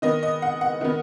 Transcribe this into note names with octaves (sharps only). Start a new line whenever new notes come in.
D#3 B3 D#5
D#5
F#5
F#5
D#3 B3